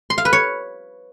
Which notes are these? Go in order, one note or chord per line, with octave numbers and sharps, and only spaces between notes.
C6
F5
B4
C#5